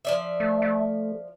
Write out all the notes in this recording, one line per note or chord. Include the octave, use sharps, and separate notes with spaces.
F3 D5 E5
A3
A3